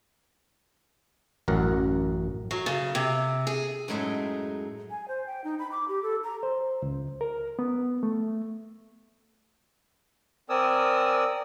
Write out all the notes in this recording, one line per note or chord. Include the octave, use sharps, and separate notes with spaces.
A1 F#2 A#4 F#5
F#3
C#3
C3
G#4
F#2 A2 G#3 D#4 E5
G#5
C5
G5
D#4
B5
D6
G4
A4
A#5
C5
C#2
A#4
B3
A3
C4 A#4 D5 G#5 D#6 E6